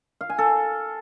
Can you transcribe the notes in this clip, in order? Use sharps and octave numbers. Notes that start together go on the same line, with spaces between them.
F5
G#5
A4